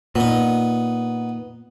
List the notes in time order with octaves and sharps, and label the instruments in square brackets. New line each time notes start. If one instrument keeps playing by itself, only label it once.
[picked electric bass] A#2 [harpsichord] B3 D#4